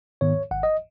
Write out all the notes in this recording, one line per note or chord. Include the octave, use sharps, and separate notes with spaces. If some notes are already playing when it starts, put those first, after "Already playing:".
G#2 D#3 B3 C#5
G#1 F#5
D#5